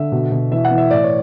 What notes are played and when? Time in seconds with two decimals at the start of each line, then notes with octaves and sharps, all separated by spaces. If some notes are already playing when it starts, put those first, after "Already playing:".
Already playing: D3 E5
0.12 B2
0.32 B2
0.52 E3 E5
0.65 F#5
0.71 E3
0.78 E5
0.91 A2 D5
1.03 C#5